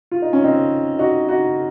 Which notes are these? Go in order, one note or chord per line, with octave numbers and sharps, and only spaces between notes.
F4
D#4
C#4
C4 D#4
D#4 F#4
D#4 F#4